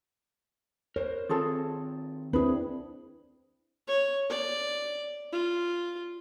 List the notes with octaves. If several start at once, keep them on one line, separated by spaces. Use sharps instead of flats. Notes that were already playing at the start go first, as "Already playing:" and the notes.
A#4 C5 C#5
D#3 C4 F4 G#4 A4
C4 D4 E4 G#4 B4
C#5
D5
F4